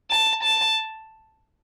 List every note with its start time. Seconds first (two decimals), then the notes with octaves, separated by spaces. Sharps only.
0.10 A5
0.43 A5